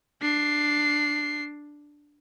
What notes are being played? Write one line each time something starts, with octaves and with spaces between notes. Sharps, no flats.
D4 C7